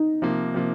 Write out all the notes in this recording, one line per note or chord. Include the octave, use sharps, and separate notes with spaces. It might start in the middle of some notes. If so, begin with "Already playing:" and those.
Already playing: D#4
C3 F3 A#3
C3 F3 A#3